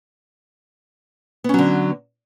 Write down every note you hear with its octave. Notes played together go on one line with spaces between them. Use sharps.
D3 F#3 B3 C#4